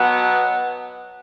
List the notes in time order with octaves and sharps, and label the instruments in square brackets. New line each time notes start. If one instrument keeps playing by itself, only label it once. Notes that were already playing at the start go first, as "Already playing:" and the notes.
Already playing: [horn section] B2 F#3 B3